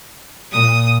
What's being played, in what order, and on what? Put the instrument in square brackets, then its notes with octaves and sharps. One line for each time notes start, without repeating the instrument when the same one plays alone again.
[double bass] A#2 [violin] D#6